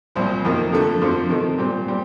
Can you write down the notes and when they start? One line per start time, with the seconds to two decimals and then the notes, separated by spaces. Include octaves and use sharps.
0.15 C2 A#2 F3 C4
0.45 F2 C3 D#3 A#3
0.72 F2 D3 A3
1.01 F2 D3 F3 C4
1.29 C3 D#3 A3
1.58 A#2 G3 C4
1.86 A#2 G3 C4